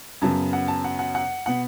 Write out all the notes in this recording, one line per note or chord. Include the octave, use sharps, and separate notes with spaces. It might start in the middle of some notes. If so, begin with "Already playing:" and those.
F#2 C#3 F#3 B3 A5
F#5
A5
F#5
F#5
F#5
B2 B3 F#5